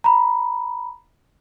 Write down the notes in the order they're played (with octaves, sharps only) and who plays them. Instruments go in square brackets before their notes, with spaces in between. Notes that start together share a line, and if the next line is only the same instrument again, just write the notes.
[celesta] A#5 B5